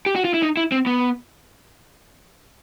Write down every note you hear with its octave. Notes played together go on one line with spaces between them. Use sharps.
G4
F#4
F4
E4
D#4
E4
C4
B3